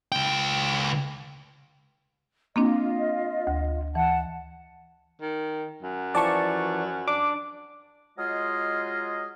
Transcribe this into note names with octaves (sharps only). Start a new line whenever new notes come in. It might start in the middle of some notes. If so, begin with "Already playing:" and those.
C#2 G5
A#3 C4 D4 F4 D#5
D2
E3 F#5 A5
D#3
F#2
E3 F3 D5 A5 C#6
D4 D6
F#3 G#3 F4 G#4 D#5 F6